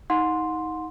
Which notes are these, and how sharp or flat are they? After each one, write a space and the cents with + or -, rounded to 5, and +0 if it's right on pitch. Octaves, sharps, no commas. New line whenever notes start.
D#4 +25 F#5 -35 C6 +0